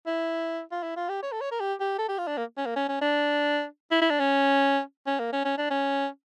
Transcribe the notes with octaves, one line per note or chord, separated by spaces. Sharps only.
E4
F4
E4
F4
G4
C#5
A4
C#5
A#4
G4
G4
A4
G4
F4
D4
A#3
C#4
A#3
C#4
C#4
D4
E4
E4
D4
C#4
C#4
A#3
C#4
C#4
D4
C#4